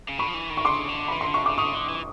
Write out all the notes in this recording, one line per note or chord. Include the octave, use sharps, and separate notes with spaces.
C#3
D3 B5 C#6
F3
E3
D#3
C#6
C#3 C6 D6
D3
E3 B5
D#3 C6
D3
C#6
C#3 D6
D3 C#6 D#6
C#3
D3
E3